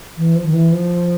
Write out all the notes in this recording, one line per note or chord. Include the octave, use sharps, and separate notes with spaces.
E3
F3
D#3
E3
F3